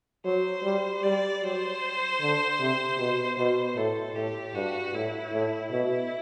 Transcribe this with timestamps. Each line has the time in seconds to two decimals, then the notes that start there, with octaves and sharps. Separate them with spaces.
0.25 F#3 C5
0.64 G3
1.03 G3 D5
1.42 F#3 C5
2.20 D3
2.60 C3
2.99 B2
3.37 B2 C5
3.76 A2 A4
4.15 A2 G4
4.55 G2 F#4
4.94 A2 E4
5.33 A2
5.71 B2 E4